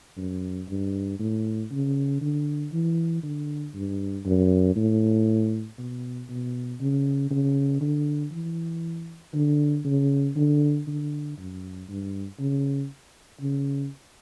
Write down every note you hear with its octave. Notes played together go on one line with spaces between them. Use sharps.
F#2
G2
A2
C#3
D3
E3
D3
G2
F#2
A2
B2
B2
C#3
C#3
D3
E3
D3
C#3
D3
D3
F#2
G2
C#3
C#3